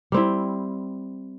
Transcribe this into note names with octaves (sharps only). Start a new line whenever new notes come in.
G3 C4 E4